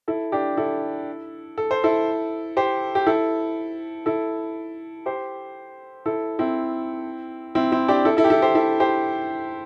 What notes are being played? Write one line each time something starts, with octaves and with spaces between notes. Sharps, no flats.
E4 A4
D4 G4
E4 A4
A4
C5
E4 A4
G4 C5
G4
E4 A4
E4 A4
G4 C5
E4 A4
C4 E4
C4 E4
C4 E4
D4 G4
E4 A4
E4 A4
G4
E4 A4
G4 C5
E4 A4
G4 C5